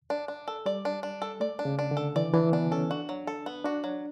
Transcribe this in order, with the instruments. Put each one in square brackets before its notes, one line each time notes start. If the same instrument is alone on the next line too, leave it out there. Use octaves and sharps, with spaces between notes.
[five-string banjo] D4
D4
A4
[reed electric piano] G3 [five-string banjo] D5
[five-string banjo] D4
D4
A4
[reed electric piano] A3 [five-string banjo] D5
[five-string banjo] D4
[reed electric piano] C#3
[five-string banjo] D4
[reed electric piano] D3
[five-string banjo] A4
[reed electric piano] E3 [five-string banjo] D5
[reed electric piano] E3 [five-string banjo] D4
[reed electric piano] B3 [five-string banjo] D4
[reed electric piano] C#4 [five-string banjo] A4
[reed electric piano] D4 [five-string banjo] F#4
[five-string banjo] F#3
A4
B3
[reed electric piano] D4 [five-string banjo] F#4
[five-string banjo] F#3